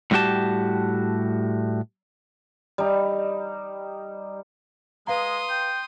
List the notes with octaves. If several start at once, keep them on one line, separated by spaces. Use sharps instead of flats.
A2 G3 C#4 F#4 G4 A5
G3 D#4
G#3 B4 F5 A#5 C6 D#6
G5